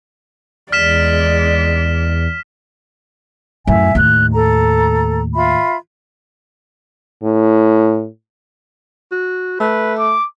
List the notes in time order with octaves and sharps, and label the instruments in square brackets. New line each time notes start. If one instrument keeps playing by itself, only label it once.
[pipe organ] E2 [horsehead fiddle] G#3 D5 [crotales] F6 B6 E7
[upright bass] F#2 A2 [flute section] E5 G#5
[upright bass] D#2 A2 [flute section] F#6
[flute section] A4 A#5
F4 E5 B5
[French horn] A2
[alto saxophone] F#4
[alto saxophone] A3 [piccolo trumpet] B4
[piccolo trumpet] D6